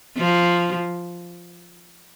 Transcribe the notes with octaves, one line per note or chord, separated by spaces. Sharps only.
F3